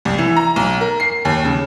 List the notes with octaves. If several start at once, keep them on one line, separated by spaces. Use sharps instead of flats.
C2
E3
A#5
B1
A#4
C7
D#2
C#3